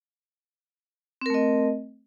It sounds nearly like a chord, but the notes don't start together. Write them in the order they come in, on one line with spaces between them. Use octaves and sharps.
C4 A#4 A3 D#5